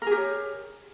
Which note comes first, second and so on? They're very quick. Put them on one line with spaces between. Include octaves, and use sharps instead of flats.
A#4 G#4 G4 C#5